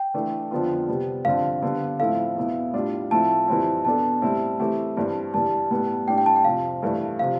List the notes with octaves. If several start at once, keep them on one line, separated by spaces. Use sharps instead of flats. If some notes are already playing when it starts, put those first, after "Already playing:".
Already playing: G5
E3 A3 D4 A4
F2 D3 F3 B3 F4
C3 G3 B3
G2 D3 F3 C4 F4 F5
D3 G3 B3
A2 F3 C4 E4 A4 F5
E2 B2 B3 E4
A2 G3 D4 F4
A2 F3 A3 C4 E4 A5
F2 E3 G3 C4 E4
B2 B3 D4 A4 A5
A2 G3 C4 E4
E3 A3 C4 E4 G4
G2 E3 G3 C4
G2 E3 G3 A5
A2 G3 B3
A2 G3 D4 G5
G5
A5
G5
F2 C3 F3 C4 F5
G2 E3 A3
C3 F3 F5